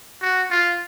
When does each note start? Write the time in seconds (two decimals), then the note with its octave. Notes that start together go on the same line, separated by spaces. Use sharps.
0.22 F#4
0.51 F4